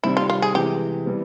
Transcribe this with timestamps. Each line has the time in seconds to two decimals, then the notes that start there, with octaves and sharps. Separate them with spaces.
0.03 C3 D#3 G3 C4 E4
0.17 F4
0.30 F4
0.42 G#4
0.54 C3 E3 G#3 G4
1.06 E3 G3 B3